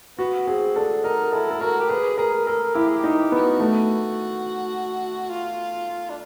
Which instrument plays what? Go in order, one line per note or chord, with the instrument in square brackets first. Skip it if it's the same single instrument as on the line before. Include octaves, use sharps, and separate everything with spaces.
[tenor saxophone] B3 [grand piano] F#4
[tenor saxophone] C4 [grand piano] G#4
[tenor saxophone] D4 [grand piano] A4
[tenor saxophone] D#4 [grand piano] A#4
[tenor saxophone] E4 [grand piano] A4
[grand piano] A4
[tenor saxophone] F#4 [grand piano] A#4
[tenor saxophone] G4
[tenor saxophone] G#4 [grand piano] B4
[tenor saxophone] G#4 [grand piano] A#4
[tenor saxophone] A4 [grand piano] A#4
[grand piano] E4 [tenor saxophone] G4
[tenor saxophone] G#4
G4
[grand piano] D#4
[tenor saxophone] G4
[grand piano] B3 [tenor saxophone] G4
[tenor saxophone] F#4
[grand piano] A3
[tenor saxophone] F4
D4